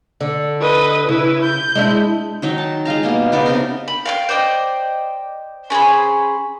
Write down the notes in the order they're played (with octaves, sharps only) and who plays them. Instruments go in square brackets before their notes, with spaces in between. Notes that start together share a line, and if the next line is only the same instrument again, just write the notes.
[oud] D3
[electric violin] B4 D#5
[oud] C#3 [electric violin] E4 B4
[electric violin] G6
[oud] G#3 D4 E4
[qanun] D#3 F#3 D#4
A5
G#3 F4 F5 A#5
B2 G3 A#3 B3
C#3 B3 D4 D#4
C3 B3 A#4 C5
[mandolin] B5
F5 G5 F6
C5 D5 D#5 G5
C#4 G#4 C5 B5